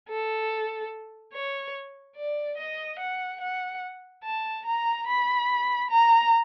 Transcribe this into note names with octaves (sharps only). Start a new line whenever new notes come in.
A4
C#5
D5
D#5
F#5
F#5
A5
A#5
B5
A#5